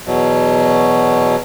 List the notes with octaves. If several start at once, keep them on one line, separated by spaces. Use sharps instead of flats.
E2 B2 F#3